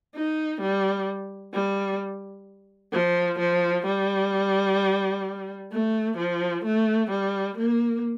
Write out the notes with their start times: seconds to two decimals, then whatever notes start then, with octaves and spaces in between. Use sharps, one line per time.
0.15 D#4
0.61 G3
1.54 G3
2.93 F3
3.39 F3
3.86 G3
5.72 A3
6.18 F3
6.64 A3
7.11 G3
7.58 A#3